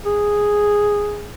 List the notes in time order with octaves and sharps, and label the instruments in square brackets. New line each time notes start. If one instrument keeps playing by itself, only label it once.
[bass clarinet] G#4